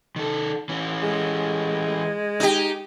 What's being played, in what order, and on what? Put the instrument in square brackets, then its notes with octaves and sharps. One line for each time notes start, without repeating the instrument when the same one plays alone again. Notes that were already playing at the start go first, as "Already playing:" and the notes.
[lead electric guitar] D#3 A4
E3 C#4
[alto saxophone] G#3
[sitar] D#4 G4